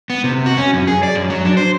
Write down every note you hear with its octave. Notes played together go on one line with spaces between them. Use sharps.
B3
C3
F#4
C#4
F#2
G#4
D5
F#2
F#3
D4
C5